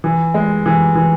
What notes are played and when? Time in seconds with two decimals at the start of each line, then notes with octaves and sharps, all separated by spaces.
0.04 E3
0.34 G#3
0.66 E3
0.95 E3